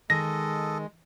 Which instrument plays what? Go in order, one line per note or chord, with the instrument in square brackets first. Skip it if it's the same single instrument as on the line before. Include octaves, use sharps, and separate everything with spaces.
[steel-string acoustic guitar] D#3 [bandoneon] G#3 [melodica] A4 D#5 [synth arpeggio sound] A#6